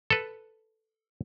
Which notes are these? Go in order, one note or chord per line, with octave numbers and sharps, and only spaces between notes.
A4 B4